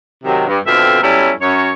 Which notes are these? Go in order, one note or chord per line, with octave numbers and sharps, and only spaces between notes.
C3 D#3 F#3
G2
F2 B2 D3 C4 E5 F5
F#3 G3 B3 C#4 E4 A4
F#2 C#5